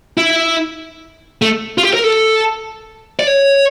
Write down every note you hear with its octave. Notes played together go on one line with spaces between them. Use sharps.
E4
A3
F4
G4
A#4
A4
D5
C#5